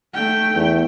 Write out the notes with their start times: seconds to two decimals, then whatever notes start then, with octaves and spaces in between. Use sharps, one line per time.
0.14 A3 G5
0.55 E2